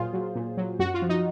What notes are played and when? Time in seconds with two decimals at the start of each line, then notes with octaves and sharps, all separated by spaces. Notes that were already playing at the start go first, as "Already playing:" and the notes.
Already playing: A#2 F#3 F4 G#4 C5
0.14 F#3
0.36 A#2
0.57 F#3
0.79 F#2 F#4
0.94 F4
1.02 F3
1.09 D#4